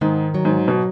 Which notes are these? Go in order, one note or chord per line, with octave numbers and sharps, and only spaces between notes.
G#2 D#3
F#3
G#2
B2